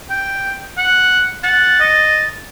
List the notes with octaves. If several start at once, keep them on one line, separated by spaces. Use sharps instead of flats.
G5
F#5
F#5 A6
D#5